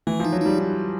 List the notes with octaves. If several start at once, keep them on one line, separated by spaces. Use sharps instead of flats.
E3 A3
F3 D#4
F#3
G3 D#4